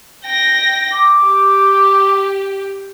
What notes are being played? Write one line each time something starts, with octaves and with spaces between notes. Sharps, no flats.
G5 A#6
D6
G4